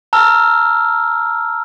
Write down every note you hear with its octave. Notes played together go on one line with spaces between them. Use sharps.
A5 A#5 E6 F6